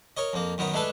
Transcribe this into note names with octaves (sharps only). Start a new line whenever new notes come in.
A#4 C#5 D#5
F2 A#3
F#2 D#3 B3 D#4
G#3 A3 D4 A4 B4